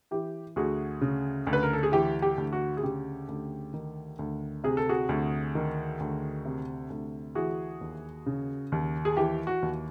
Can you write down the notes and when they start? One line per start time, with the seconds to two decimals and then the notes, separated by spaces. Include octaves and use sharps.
0.11 E3 G4
0.56 D2 F#4 G#4
1.01 C#3
1.47 D2
1.53 B4
1.63 A#4
1.73 A4
1.83 G#4
1.92 E3 G4
2.22 G4
2.38 D2
2.53 F#4
2.77 G#4
2.83 C#3 G4
3.29 D2
3.74 D#3
4.19 D2
4.64 C3 G#4
4.77 A4
4.89 F#4 G#4
5.09 D2
5.55 D#3
6.00 D2
6.45 C3
6.90 D2
7.35 E3 F#4 G#4
7.81 D#2
8.26 C#3
8.72 D#2
9.05 G#4
9.17 E3 G4
9.47 F#4
9.62 D#2